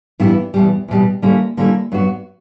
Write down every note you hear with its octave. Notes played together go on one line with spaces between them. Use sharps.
G2 E3 G3 B3 E4
E2 B2 G3
E2 B2 G3
D3 G3 A#3 C#4 E4
D3 G3 A#3 C#4 E4
G2 F#3 B3 F#4